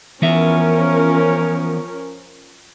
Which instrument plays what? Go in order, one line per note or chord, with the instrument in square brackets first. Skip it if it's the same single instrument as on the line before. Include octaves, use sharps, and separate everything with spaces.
[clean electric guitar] E3 B3 E5 [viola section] F3 C#4 A#4